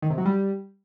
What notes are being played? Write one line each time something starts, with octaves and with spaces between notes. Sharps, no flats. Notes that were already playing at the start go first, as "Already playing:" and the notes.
D#3
C3
F#3
G3